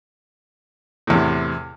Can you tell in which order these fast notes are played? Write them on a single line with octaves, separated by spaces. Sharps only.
A2 E2 C3